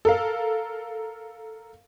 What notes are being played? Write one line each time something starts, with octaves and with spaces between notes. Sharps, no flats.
A4 A#4 F5